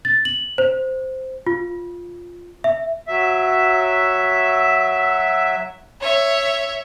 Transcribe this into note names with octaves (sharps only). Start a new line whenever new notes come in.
A6
F#7
C5
F4
E5
F#3 E5
C#5 E5